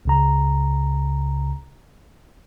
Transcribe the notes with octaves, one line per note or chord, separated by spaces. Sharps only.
C#2 C#3 A#5